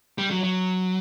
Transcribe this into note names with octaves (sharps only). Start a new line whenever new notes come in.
G3
F#3
F#3